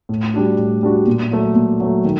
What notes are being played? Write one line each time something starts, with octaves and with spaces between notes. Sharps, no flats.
A2
G3 D4 F#4
A2
G3 D4 F#4
A#2
F#3 A3
A#2
F#3 A3
D#3